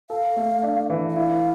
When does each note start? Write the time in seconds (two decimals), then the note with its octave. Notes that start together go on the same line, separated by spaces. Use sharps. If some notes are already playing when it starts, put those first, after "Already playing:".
0.10 A4 F5
0.36 A3
0.63 D4
0.90 E3
1.10 E5
1.16 E4 F5